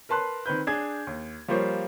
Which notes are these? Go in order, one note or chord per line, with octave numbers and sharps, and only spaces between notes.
A#4 B4 A5 C6 F#6
D#3 C4 B4 G6
D4 G#4 G#6
D#2
F3 G3 A#3 A#4 C5 C#5